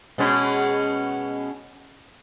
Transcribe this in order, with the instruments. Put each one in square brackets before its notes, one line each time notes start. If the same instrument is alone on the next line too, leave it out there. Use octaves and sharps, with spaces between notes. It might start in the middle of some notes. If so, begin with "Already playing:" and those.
[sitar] B2 G#3 C#4